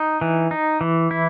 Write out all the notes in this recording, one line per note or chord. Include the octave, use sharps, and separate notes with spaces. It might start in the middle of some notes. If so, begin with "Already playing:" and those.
Already playing: D#4
E3
D#4
E3
E4